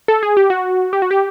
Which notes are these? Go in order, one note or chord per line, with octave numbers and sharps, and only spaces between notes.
A4
G#4
G4
F#4
G4
F#4
G4